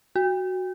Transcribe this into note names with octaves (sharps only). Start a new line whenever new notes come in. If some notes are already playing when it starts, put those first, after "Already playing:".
F#4